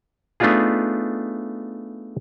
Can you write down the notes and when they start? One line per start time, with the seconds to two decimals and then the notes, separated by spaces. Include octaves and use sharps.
0.40 A3 B3 D4 D#4 F4 G#4